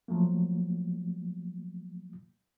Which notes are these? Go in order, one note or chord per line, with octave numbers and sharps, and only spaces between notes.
F3 F#3 A3 A#3